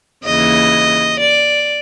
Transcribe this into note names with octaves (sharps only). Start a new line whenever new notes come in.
D#2 C#3 E3 D#5
D5